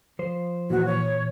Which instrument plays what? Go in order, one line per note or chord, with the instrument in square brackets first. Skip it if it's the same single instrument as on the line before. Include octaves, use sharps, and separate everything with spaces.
[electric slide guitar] F3 C5
[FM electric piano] A#2 E3 [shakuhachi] F#4
[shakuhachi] C#5